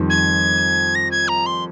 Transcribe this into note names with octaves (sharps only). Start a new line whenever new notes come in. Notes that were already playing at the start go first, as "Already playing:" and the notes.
Already playing: F2 D#3 G3 C4
G#6
A#6
G#6
A#5
C6